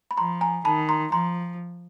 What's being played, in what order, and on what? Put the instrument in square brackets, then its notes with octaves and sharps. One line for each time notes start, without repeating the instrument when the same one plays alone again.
[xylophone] B5
[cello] F3 [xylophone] A#5 C6
[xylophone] G#5 A#5
[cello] D#3 [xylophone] A5 B5
[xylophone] A#5 C6
[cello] F3 [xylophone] A#5 C6